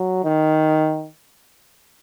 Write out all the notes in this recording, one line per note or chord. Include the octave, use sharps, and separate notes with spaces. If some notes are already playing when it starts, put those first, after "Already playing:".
Already playing: F#3
D#3